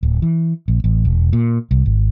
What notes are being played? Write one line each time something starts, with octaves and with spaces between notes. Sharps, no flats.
D1
E3
A#1
A1
E1
A#2
C2
G#1